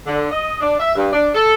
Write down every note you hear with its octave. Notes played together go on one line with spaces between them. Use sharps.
D3
D#5
D4
E5
G2
D4
A4